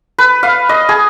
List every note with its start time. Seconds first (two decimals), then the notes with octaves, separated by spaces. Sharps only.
0.18 B4
0.43 F5
0.69 D#5
0.89 G#4